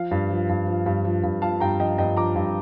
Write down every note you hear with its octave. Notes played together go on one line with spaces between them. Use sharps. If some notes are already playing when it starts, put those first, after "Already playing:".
Already playing: F3 F5
G2
F3
G2
F3
G2
F3
G2
F3 F5 A5
G2 G5 A#5
F3 D#5 G5
G2 D#5 G5
F3 A#5 D6
G2